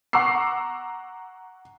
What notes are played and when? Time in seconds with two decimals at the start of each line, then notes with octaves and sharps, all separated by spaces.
0.13 F#5 A#5 C#6 D6 E6 C7